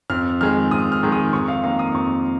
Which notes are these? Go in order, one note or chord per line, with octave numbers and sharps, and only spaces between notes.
F2 F6
D#3 G#3 F6
F2 D#6
F6
D#3 G#3
D#6
F2 C#6
F5
D#3 A#3 F5
D#6
F2 C#6